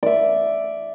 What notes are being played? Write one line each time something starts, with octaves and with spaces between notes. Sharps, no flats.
D5 E5